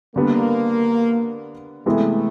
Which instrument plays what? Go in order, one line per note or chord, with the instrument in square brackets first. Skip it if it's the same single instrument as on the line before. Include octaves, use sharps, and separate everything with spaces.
[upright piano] D3 G3 B3 D4 [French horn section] A#3
[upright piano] C3 E3 G#3 B3 [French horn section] A3